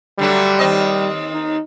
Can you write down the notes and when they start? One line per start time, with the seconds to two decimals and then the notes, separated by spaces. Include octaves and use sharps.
0.19 D3 F#3 G3 A3
0.59 D#2 C4 D#5
1.34 D#4